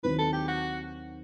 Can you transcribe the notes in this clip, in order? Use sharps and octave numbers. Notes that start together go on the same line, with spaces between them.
D#2 D#3 F#3 C4 E4 B4
A4
G4
F#4